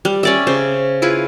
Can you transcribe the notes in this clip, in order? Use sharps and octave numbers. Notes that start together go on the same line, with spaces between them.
G3
C#4 D5 E5
C#3 C5
E4 F4 G#4 B4